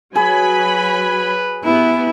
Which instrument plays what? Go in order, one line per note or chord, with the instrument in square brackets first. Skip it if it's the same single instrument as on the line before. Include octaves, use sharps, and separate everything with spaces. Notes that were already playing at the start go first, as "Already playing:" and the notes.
[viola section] F#3 G#5 B5 [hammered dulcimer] G#4 [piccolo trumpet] B4
[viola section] B3 G4 [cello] E4